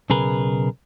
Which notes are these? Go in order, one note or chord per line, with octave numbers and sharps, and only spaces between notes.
B1 C#3 G#4 A#4 B4